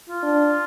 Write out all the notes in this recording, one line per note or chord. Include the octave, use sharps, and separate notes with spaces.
F4
D4